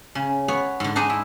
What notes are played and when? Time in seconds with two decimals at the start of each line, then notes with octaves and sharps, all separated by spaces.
0.15 C#3
0.48 B3 C#5
0.80 G#2 D3
0.96 D4 D#4 G#4 C5 D#5
1.10 E4